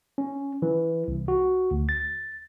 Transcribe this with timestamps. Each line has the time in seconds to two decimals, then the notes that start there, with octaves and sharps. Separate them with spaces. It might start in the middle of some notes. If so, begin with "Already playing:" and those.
0.18 C#4
0.62 E3
1.08 C2
1.28 F#4
1.71 D2
1.89 A6